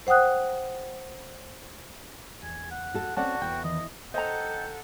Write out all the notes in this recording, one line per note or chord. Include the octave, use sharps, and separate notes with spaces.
C5 F#5 G5 D#6 F#6
E2 G#5
F#5
F#4 A4
C4 C#4 F#4 D5 F#5 A5
E2 G5
D#3 E3 D#5
A4 C5 D#5 F#5 G5 A#5